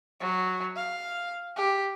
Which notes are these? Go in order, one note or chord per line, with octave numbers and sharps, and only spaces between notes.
F#3
F5
G4